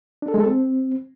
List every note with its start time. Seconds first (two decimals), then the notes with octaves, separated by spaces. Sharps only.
0.22 D4
0.28 A4
0.34 G#3
0.40 A4
0.46 C4